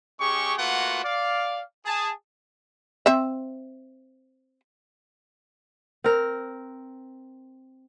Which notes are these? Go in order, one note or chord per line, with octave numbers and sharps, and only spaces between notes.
G#3 C#4 G4 G#4 C#6
A3 A#3 F4 F#4 B4 F#5
D5 F5
G#4 A5
C4 E5
C4 A#4